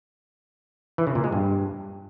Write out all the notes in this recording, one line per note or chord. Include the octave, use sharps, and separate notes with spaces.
E3
C#3
A#2
G#3
G2